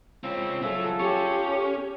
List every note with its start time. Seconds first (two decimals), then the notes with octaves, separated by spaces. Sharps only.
0.23 C4 C#4 F4
0.62 F#3 F4 G#4 A4 E5
1.00 C#4 G4 C#5